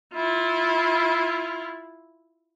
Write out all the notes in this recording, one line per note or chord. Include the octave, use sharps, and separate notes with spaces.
E4 F4